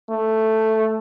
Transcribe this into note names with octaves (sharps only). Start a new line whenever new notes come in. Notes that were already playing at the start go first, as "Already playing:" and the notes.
A3